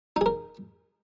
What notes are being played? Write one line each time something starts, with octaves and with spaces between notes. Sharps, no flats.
D#4 G#4 A#4